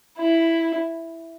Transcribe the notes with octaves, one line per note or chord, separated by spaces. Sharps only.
E4